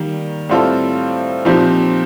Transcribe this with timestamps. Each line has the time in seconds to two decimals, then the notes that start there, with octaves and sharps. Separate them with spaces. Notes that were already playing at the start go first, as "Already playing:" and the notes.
Already playing: D#3 G3 A#3
0.49 A2 G3 C4 F4 A4
1.45 A#2 F3 C4 D#4 G4